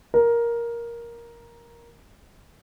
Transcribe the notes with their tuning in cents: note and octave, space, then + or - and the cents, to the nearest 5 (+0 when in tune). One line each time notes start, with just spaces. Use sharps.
A#4 +10